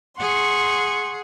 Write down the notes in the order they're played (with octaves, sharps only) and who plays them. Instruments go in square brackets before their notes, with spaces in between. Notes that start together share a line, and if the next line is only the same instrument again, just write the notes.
[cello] G#4 F#5 [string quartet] C6 [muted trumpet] C#6